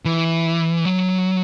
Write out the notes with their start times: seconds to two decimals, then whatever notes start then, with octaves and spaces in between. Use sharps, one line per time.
0.05 E3
0.85 F#3